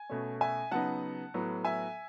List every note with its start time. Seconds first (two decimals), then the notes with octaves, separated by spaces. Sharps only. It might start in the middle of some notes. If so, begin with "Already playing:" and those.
Already playing: G#5
0.10 B2 A3 C#4
0.41 E5 G#5
0.71 C#3 F#3 B3 D#4 F#5 A5
1.34 A2 F#3 B3
1.65 E5 G#5